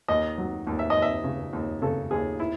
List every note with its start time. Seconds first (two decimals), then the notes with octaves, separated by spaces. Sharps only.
0.08 D#2 D#5
0.38 F#3
0.67 D#2
0.79 E5
0.90 D#5
0.96 D#2
1.02 E5
1.24 C#3
1.53 D#2
1.82 C#3 A4
2.11 D#2 G#4
2.40 E4